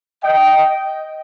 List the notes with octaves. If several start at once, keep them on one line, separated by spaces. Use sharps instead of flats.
D#5 G5